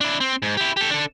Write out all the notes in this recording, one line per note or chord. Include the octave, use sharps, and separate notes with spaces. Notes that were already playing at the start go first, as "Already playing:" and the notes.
D4 E4
C4
G#2
E4 G4
G4 A4
D4 A4